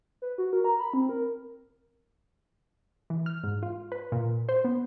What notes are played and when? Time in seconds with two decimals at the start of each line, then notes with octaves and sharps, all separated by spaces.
0.22 B4
0.38 F#4
0.53 A#4
0.64 A#5
0.80 B5
0.93 C4
1.09 A#4
3.10 E3
3.26 F6
3.43 G#2
3.63 F4
3.92 B4
4.12 A#2
4.49 C5
4.64 B3